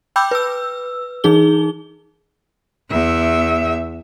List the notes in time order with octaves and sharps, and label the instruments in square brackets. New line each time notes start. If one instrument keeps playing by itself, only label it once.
[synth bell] G5 B5 D6 E6 G6
B4 E6
E3 D#4 G#4 G7
[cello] E2 E5